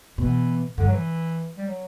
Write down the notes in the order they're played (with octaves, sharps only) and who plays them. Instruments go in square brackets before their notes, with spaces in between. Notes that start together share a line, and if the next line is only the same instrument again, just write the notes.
[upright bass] B2 [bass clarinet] E3
[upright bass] G2 [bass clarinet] D3
[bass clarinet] F#3
E3
G3
F#3